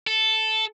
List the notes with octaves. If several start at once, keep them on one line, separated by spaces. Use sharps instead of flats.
A4